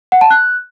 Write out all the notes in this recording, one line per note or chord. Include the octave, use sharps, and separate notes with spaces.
F#5
A5
F#6